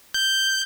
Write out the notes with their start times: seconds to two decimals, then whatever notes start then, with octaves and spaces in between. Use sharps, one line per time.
0.14 G6